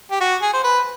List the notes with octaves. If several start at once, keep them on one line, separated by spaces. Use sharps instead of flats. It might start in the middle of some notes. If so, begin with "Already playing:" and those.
G4
F#4
G#4
C5
B4